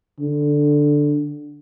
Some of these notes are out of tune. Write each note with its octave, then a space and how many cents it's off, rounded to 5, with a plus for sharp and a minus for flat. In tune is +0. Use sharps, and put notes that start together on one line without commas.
D3 +0